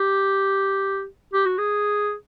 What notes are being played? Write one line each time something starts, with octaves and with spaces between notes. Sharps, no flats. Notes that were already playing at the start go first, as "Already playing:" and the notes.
Already playing: G4
G4
F#4
G#4